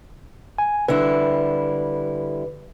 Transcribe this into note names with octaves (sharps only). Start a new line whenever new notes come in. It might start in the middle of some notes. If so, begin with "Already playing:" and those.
G#5
D3 G3 E4 B4